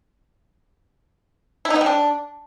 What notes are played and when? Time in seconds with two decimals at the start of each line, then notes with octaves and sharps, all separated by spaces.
1.65 E4
1.70 D#4
1.76 B3
1.81 G3
1.86 D4